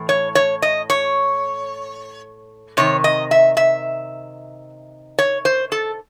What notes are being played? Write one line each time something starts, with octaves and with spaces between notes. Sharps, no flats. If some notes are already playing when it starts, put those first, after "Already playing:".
Already playing: A2 E3
C#5
C#5
D#5
C#5
C3 D#3 C#5
D#5
E5
E5
C#5
C5
A4